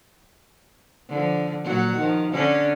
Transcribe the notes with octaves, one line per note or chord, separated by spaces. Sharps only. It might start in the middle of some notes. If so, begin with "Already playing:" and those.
D3 F3
A#2 F#3 F#4
D#3 F3
D3 C#4 D4